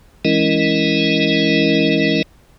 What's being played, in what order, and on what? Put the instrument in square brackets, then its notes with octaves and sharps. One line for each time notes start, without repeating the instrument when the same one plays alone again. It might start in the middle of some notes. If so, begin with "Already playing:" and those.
[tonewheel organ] E3 G#3 C#4 E4 A#4 D#5